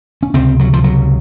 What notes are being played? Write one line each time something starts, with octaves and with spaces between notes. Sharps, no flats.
C#4
C#2 C3 C4
F#3
F3
F#3